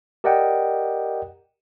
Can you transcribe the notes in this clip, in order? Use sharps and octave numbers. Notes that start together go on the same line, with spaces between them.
G4 A#4 D5 D#5 F#5 G5